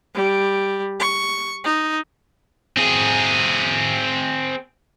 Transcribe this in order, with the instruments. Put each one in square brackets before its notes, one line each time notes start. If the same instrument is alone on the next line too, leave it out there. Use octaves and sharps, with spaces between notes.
[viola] G3
C#6
D#4
[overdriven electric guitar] C4 G#4